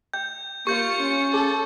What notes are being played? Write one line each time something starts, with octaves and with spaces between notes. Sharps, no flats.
G5 G6
A#3 F4 G4 C#6 G6 C#7
C#4
G#4 A4